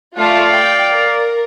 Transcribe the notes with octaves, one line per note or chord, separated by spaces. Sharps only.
A3 F4 D5 F5
G5
A#4